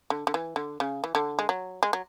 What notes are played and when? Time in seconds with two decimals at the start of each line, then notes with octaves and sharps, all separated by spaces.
0.10 D3
0.27 D3
0.34 E3
0.56 D3
0.80 C#3
1.04 E3
1.15 D3
1.39 G#3
1.49 F#3
1.83 G#3
1.93 F#3